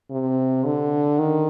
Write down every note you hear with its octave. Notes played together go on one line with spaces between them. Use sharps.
C3
D3
D#3